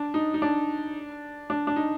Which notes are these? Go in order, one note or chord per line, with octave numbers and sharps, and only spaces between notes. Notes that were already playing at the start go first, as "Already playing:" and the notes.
Already playing: D4
D#4
D#4
D4
D4
D4
D#4